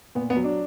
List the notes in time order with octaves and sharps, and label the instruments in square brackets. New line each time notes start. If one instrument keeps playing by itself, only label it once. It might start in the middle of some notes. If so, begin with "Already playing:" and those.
[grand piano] A#2 B3
B3
F#3
D4